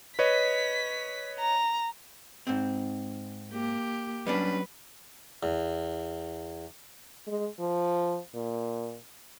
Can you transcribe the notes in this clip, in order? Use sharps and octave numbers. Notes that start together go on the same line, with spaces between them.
B4 C#5 D#5 B6
A#5
G#2 C4
A#3 G4
F#3 G3 C#4 D4 B4
E2
G#3
F3
A#2